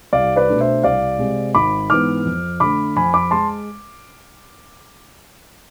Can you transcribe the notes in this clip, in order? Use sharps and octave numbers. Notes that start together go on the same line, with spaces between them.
C2 D5 F5
B4 D5
B2 A3 D4
C5 E5
C2 D5 F5
C3 G#3 C4
G#1 B5 D6
G#2 E3 B3 D6 F6
F2
D3 A3 B5 D6
F2 G#5 B5
B5 D6
G#3 A5 C6